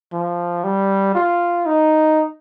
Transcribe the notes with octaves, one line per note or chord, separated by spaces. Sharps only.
F3
G3
F4
D#4